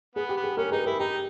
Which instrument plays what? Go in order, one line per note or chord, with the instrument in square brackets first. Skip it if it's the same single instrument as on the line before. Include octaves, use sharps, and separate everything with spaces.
[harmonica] B3 [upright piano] G#4
[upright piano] G4
[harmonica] B3
[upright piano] G#4
[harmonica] C#4 [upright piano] G4 A#4
[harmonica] D#4 [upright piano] G#4 B4
[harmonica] E4 [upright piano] G4 A#4
[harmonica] D#4 [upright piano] G4